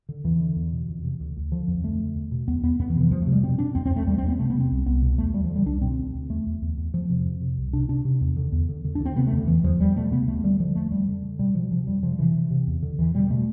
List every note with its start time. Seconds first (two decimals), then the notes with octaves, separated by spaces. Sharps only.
0.09 D3
0.24 E2 E3
0.40 D3
0.56 E2
0.72 B2
0.88 F2
1.04 C3
1.20 D2
1.37 D2
1.52 D3 F3
1.68 F2
1.84 D3 A3
2.00 D3
2.15 E2
2.32 B2
2.48 E2 B3
2.63 E2 B3
2.79 F2 B3
2.90 E3
2.95 C3
3.01 E3
3.11 F2 F3
3.22 A3
3.27 C3
3.32 G3
3.43 B2 C4
3.59 B2 D4
3.75 F2 C4
3.86 C4
3.91 F2
3.96 A3
4.07 E2 G3
4.18 E2 C4
4.28 B3
4.39 C3 A3
4.50 B3
4.55 C3
4.60 C4
4.71 C2
4.86 C2 B3
5.02 B2
5.18 E2 A3
5.34 D2 G3
5.44 F3
5.50 D3
5.56 G3
5.66 C2 D4
5.82 B2 C4
5.98 D2
6.14 D2
6.30 E2 A3
6.46 E2
6.62 E2
6.77 E2
6.93 F2 F3
7.09 C3
7.25 F2
7.41 C3
7.57 C2
7.73 C3 D4
7.89 C3 D4
8.05 C3
8.21 E2
8.37 D3
8.52 E2
8.69 D3
8.85 D3
8.95 D4
9.00 D2
9.06 C4
9.16 C3 B3
9.27 A3
9.32 F2 D3
9.48 E2 E3
9.64 E2 F3
9.80 E2 G3
9.96 B2 A3
10.12 C3 B3
10.28 D2 A3
10.44 D3 G3
10.60 D3 F3
10.75 F2 A3
10.91 F2 G3
11.08 D3
11.24 D3
11.39 B2 G3
11.55 B2 F3
11.71 C3 F3
11.87 F2 G3
12.03 C3 F3
12.19 C3 E3
12.35 C3
12.51 C3
12.67 E2
12.83 D3
12.98 E2 E3
13.14 B2 G3
13.30 B2 A3